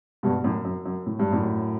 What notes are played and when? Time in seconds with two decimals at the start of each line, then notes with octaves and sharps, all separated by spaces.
0.23 G2 B2
0.44 F#2 A2
0.65 F#2
0.86 F#2
1.06 A2
1.19 G2
1.32 F#2 A2